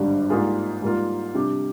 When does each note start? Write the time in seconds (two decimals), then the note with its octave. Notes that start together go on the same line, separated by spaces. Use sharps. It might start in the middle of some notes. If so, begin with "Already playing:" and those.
Already playing: G#1 G2 D3 G3
0.30 G#2 G3 A#3 F4 G#4
0.82 G#2 G3 A#3 F4
1.34 C3 G3 D4 G4